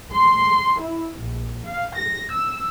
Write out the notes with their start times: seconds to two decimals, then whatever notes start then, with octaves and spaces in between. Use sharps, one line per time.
0.11 C6
0.78 E4
1.19 A#1
1.64 F5
1.96 A#6
2.30 E6